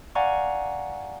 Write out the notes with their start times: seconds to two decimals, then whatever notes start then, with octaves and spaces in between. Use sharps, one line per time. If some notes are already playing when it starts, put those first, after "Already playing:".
0.15 D5 F5 F#5 G#5 A#5 C#6